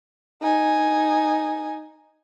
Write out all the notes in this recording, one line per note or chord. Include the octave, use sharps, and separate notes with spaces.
D#4 G#5